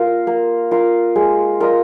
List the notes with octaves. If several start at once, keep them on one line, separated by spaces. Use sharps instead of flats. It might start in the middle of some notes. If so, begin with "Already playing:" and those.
Already playing: A#3 F4 A#4 F5
A#3
F4 A#4 F5
G#3
F4 A#4 D#5